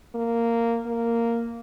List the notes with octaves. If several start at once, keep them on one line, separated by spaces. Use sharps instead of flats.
A#3
A#3